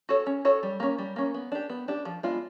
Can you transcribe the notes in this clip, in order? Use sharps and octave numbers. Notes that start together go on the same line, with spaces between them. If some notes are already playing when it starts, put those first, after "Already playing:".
F#4 A4 C#5
C#4
F#4 A4 C#5
G3
A#3 C#4
G3
A#3 C#4
B3
D4 G4
B3
D4 G4
F3
G#3 B3 D4 F4